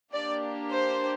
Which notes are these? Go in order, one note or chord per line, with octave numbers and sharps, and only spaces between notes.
A#3 D4 G4 D5
C5